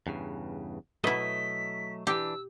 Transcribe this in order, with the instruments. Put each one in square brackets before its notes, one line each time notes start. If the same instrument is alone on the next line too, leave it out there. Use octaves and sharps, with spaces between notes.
[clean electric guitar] E2 G2 C#3
[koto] B2 E4 [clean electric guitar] F#3 A3 D#5 [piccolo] B6
[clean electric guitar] E3 D4 [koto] G4 [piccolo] E6